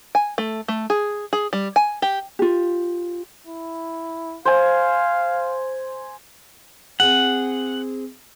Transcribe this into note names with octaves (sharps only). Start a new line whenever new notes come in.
G#5
A3
A3
G#4
G#4
G3
G#5
G4
F4 G4
E4
C5 F5 G#5
C4 G#4 F#5